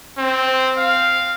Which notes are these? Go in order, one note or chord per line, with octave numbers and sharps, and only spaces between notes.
C4
F5